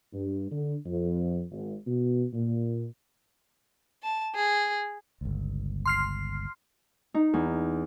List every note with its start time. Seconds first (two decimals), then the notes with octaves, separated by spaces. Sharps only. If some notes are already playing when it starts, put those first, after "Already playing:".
0.13 G2
0.51 D3
0.86 F2
1.51 G#1
1.86 B2
2.34 A#2
4.03 A5
4.35 G#4
5.21 G1 C#2
5.86 C6 F6 C7
7.14 D#4
7.33 E2